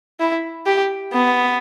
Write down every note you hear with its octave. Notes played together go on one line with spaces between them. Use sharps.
E4
G4
B3